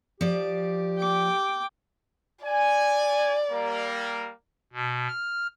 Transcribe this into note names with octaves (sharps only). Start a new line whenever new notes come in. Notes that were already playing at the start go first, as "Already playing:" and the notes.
F3 G4 D5
G5 D6
D5 G#5
G3 A#3
B2
F6